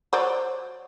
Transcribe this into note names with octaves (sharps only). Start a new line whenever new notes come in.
F#3 C5 D5